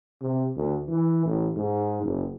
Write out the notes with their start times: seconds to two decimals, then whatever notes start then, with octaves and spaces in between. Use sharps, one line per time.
0.21 C3
0.56 D2
0.88 E3
1.25 A1
1.56 G#2
2.03 F#1